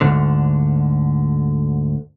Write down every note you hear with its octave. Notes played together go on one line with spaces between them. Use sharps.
D2 G#2 D3